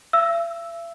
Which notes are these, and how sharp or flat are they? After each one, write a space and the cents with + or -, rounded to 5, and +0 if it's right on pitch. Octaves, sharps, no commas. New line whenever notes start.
E5 +45 E6 +0